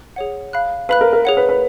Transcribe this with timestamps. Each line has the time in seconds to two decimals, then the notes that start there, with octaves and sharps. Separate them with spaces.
0.16 G#4 C#5 F#5
0.53 F5 B5 F#6
0.89 B4 F5 B5 F#6
1.01 A#4
1.13 A#4
1.25 G#4 C#5 F#5
1.37 B4
1.49 B4